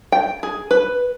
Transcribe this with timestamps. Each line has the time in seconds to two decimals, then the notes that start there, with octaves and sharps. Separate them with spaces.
0.12 G5
0.43 G#4
0.71 B4